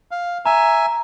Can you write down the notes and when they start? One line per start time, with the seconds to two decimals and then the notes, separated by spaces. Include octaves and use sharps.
0.11 F5
0.46 E5 G#5 A#5